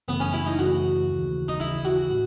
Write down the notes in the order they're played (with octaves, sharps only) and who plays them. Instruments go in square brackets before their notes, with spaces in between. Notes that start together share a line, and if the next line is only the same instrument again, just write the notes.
[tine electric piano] F#2 C#3 E3 A3 [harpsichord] B3
[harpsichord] C#4
E4
D#4
[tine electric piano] F#2 C#3 E3 A3 [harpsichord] F#4
[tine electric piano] D#2 C#3 E3
[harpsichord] D#4
[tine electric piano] D#2 C#3 E3 [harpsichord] E4
[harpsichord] F#4
[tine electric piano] A2